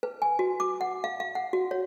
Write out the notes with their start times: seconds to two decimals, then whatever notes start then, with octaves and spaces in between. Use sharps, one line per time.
0.03 B4
0.22 G#5
0.39 F#4
0.60 D6
0.81 F#5
1.04 F5
1.20 F5
1.35 F#5
1.53 F#4
1.71 C#5